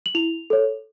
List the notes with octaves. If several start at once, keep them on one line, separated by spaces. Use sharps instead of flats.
F#7
E4 F7
A4 C#5